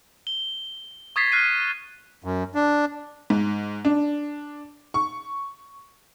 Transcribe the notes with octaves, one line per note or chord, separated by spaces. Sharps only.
G7
C#6 D#6 G#6 A6 B6 C7
F6 F#6 C7 D#7
F#2
D4
G#2
D4
C#6